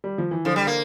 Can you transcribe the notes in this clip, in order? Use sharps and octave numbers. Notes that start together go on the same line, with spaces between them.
G3
F3
E3
D3 F3
G3
A#3